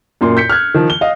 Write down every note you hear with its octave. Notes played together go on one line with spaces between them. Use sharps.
F#2 A#2 C6
G6 B6 C#7
F6 F#6 G#6
D#3 F3
G7
D#5 F5